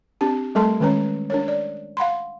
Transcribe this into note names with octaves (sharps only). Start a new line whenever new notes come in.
C4 D4 G4 A5
G3 A3 A4 A#4 A5 C6
D#3 G#3 C#4 B4 C#5 A#5
D4 A#4 C#5
D5
F5 F#5 B5 C6